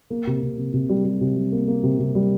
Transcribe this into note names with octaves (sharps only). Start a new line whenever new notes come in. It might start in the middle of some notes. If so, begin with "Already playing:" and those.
A#3
C3
C3
C3
C3
G3
G3
C3
G3
A#3
A#3
C3
C3
G3